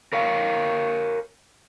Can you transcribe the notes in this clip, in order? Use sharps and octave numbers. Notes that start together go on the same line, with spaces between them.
A#4 C#5 F5